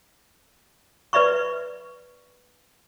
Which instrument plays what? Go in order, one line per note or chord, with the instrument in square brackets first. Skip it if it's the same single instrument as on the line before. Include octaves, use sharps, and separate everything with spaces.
[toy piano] B4 D5 E5 B5 C#6